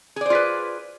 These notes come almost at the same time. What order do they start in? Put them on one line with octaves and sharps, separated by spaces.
G#4 D5 C5 F4 B4